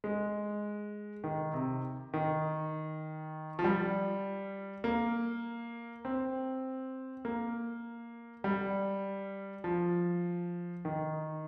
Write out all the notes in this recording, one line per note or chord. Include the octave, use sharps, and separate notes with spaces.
G#3
D#3
C3
D#3
F3
G3
A#3
C4
A#3
G3
F3
D#3